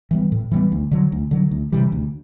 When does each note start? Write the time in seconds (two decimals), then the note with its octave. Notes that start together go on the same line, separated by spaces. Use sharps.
0.11 E3 G3 B3
0.32 A2
0.51 E3 G3 B3
0.72 D2
0.91 D3 F#3
1.12 D2
1.31 D3 F#3
1.51 D2
1.72 C3 E3 G3
1.92 D2